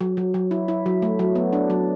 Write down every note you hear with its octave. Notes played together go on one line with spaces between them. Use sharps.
F#3
F#3
F#3
E4
E4
F#3
A3
F#3
B3
D4
F#3